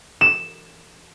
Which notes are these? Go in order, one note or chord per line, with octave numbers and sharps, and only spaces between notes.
E7